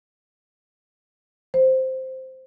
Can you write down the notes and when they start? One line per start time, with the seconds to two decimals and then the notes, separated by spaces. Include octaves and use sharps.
1.54 C5